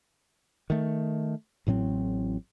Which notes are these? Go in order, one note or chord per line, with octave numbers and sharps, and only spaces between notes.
D#3 A3
A1 A2 F#3 C4